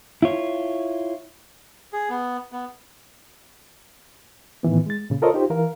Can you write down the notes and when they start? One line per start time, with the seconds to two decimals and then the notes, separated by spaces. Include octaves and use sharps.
0.22 E4 F4 C#5
1.93 G#4
2.09 B3
2.52 B3
4.63 A2 D#3 E3 B3
4.86 G#3 A6
5.10 A#2 C#3
5.22 F4 A4 A#4 C5 C#5 D#5
5.34 D#4 F4 G4 C5
5.50 E3 A#4 F5